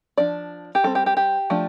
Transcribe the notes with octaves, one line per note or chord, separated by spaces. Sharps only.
F3 D4 D5
G4
G3 C4 A4
G4
G4
G4
F3 A3 D4